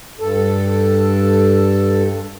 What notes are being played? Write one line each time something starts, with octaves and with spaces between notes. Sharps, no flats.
G2 A4